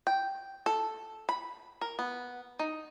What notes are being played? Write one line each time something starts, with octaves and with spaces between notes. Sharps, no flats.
G5
A4
B5
A#4
B3
D#4